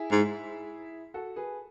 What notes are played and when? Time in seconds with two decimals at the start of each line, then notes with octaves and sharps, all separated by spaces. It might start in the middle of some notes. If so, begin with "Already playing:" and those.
Already playing: E4 G#4
0.11 G#2
1.14 F#4 A4
1.36 G#4 B4